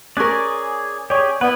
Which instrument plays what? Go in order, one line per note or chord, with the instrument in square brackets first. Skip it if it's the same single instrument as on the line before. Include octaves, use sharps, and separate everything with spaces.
[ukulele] C#4 A#4 [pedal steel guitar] G#4 D5 [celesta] C#6 F#6
[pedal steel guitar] G4 G#4 [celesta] C#5 D5 C#6
[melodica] B3 [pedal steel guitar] E4 B4 [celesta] D5 F#5